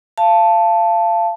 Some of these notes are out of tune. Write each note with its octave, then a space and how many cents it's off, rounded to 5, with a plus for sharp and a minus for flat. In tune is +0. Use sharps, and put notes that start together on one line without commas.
F5 -30 A5 +0